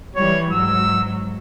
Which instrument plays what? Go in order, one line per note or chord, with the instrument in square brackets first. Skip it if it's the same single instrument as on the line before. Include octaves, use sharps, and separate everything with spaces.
[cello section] E3 G3 [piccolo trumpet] C#5
[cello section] G#2 F#3 [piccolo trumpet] E6